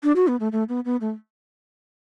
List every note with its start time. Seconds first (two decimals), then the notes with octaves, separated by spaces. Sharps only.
0.03 D4
0.16 F#4
0.28 B3
0.40 A3
0.52 A3
0.69 B3
0.85 B3
1.01 A3